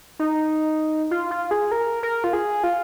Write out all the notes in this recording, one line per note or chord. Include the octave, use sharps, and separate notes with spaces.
D#4
F4
F4
G#4
A#4
A#4
F4
G#4
F4